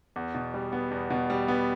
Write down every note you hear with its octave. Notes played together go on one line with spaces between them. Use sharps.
E2
B2
G3
B3
E2
B2
G3
B3